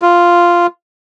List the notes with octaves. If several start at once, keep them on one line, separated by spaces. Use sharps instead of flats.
F4